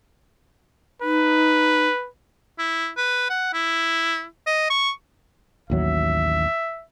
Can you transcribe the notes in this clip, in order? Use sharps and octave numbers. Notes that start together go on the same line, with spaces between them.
D#4 B4
E4
B4
F#5
E4
D#5
C#6
A1 D#2 F#3 E5